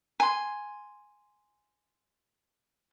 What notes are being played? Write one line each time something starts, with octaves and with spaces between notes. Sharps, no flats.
G#5 C6